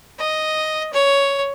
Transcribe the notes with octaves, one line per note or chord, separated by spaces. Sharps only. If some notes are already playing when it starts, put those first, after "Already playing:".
D#5
C#5